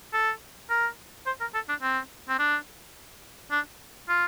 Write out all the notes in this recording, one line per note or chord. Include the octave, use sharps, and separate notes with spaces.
A4
A#4
C5
A#4
A4
D4
C4
C4
D4
D4
F4